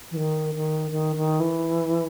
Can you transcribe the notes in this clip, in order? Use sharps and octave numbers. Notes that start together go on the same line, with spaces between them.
E3
D#3
D#3
D#3
D#3
E3